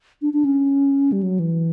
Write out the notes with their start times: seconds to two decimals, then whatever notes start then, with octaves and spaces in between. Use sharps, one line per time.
0.22 D4
0.33 D4
0.45 C#4
1.12 G3
1.23 F#3
1.39 E3